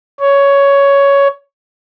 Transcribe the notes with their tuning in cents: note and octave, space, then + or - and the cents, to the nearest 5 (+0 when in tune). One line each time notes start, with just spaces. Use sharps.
C#5 +10